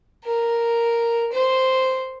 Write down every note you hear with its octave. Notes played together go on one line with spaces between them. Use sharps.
A#4
C5